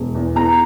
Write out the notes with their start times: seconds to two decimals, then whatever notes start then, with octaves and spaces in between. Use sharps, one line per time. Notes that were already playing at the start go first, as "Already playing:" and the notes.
Already playing: E1
0.15 E2
0.35 E2 A#5